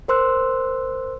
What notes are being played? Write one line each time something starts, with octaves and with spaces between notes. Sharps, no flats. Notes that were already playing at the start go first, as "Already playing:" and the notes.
A#4 C5 C6 E6 F#6